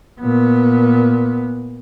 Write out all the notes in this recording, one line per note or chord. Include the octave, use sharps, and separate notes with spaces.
A#2 B3